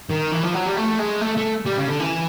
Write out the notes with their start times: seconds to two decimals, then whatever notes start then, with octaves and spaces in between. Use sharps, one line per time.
0.11 D#3
0.32 E3
0.44 F3
0.55 F#3
0.67 G3
0.77 A3
0.99 G#3
1.21 A3
1.37 A3
1.66 G3
1.77 C#3
1.89 D3
2.00 E3